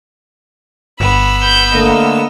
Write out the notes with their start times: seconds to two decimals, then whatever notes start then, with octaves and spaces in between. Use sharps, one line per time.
1.00 G1 B3 B5 E6
1.42 B5 G6
1.74 D3 A3 A#3 D#5